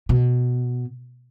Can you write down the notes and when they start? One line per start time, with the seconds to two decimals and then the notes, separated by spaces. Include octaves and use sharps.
0.09 B2